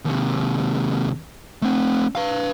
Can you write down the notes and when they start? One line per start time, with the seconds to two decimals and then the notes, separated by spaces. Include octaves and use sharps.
0.05 D#2 C3
1.62 A3 C4
2.15 B4 F5